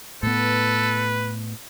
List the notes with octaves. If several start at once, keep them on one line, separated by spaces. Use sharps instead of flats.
A2 B3 A4 B4